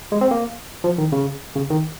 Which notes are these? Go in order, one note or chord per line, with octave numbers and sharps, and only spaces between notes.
G#3
C4
A#3
F3
D#3
C#3
C#3
D#3